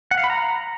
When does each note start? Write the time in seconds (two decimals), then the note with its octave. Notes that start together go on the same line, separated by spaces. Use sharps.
0.11 F#5
0.18 F5
0.24 B5
0.30 A#5